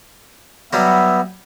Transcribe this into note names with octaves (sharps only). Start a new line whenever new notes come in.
F#3 G3 B3 F#4 E5